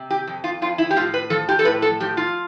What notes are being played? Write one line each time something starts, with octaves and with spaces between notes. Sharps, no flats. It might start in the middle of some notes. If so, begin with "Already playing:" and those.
Already playing: C3
G4
F2
F4
F2 F4
E4
G4
A2 F4
B4
F3 A4
G4
A4
A2 B4
A4
F3 G4
F4